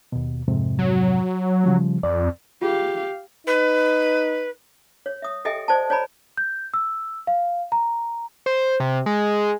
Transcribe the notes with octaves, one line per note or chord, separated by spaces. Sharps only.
D#2 B2
F2 G#2 C3
F#3
C#3 F3 G3
F2 D5
F4 G4 G#4 F5
D#4 B4
C#5
E5 D#6
G4 A4 D#5 E5 G5 G#5
C5 D5 G#5 A5
C#5 D5 G#5 A#5 B5
G6
E6
F5
A#5
C5
C3
G#3